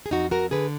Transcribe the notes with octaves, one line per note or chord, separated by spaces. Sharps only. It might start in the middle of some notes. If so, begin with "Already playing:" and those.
G#4
F2 D#4 F#4
F#4 A#4
D3 G#4 B4